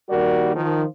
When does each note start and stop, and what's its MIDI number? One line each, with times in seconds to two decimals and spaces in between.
0.10 0.53 39
0.10 0.53 55
0.10 0.53 66
0.10 0.53 70
0.10 0.53 74
0.56 0.84 51
0.56 0.84 53